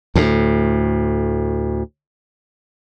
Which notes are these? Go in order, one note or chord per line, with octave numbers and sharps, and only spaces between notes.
D2 A2